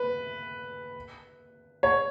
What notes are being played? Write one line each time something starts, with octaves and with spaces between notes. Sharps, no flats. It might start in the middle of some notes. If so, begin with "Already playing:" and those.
Already playing: B4
C#5